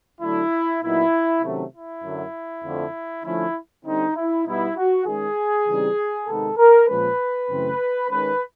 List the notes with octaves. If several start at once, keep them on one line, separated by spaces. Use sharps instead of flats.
D3 F#3 A3 D4 E4
A#2 F#3 B3 D#4 E4
C3 D#3 F#3 A3 C#4
E4
F#2 D3 F#3
F2 D3 F3 A3
D3 F3 A3 C#4 E4
D3 G3 C4 D#4
E4
B2 G3 B3 D#4 E4
F#4
D#3 G#3 C#4 G#4
C#3 E3 G3 C4 D#4
C3 D#3 G#3 B3 D#4 A4
A#4
A#2 F3 G#3 C#4 B4
F#2 C#3 E3 A3 C4
D#3 G#3 C#4 B4